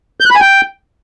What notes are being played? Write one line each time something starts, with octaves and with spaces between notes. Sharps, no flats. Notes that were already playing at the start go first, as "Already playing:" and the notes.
G6
F#6
B5
G#5
G5